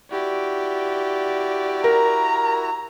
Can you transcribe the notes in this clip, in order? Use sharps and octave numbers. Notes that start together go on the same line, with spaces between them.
E4 F#4 G4 D5
A#4 A#5